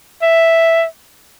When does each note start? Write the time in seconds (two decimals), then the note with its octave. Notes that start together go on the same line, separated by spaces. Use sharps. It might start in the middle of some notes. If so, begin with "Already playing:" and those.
0.22 E5